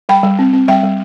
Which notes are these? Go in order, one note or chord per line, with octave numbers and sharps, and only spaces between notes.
G3 G5 B5
G3
C4
C4
G3 E5 G5
G3